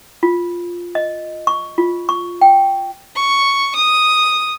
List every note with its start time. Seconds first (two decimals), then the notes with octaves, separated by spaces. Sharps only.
0.23 F4
0.95 D#5
1.47 C#6
1.78 F4
2.09 C#6
2.41 G5
3.16 C#6
3.75 D#6